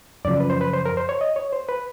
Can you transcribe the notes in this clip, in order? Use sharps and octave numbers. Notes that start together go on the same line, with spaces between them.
F#2 C#3 F3 D5
B4
C5
B4
C5
A#4
C5
C#5
D#5
C#5
C5
B4